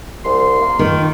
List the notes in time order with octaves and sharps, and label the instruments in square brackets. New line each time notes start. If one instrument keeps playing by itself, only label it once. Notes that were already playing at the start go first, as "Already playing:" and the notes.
[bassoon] C2 [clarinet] C6
[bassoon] A#3
[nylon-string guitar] D#3 [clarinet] F4